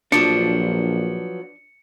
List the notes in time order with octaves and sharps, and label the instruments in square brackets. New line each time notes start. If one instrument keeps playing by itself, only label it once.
[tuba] A#1 [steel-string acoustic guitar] F3 F#3 B3 [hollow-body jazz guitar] D4 [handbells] C#7